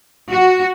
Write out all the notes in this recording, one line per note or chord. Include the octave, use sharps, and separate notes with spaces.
F#4